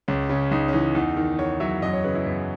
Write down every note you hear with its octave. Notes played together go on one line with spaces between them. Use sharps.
C#2 C#4
C#3 C#4
C#2 D#4
C#4
E3 D#4
E2 D#4
D#3
E2 C#5
F#3 E5
F#2 D#5
C#5
C#3 B4
E4
F#2 B3